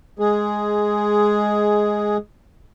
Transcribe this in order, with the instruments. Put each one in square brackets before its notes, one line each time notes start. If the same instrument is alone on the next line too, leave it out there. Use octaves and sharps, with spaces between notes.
[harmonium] G#3 G#4